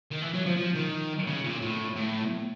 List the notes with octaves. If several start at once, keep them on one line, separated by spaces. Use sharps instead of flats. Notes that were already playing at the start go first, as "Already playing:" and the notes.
D#3
E3
F#3
F3
F3
D#3
C#3
A#2
A2
A2